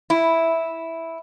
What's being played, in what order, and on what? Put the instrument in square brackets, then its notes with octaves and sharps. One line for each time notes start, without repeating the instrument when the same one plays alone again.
[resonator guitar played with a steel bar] E4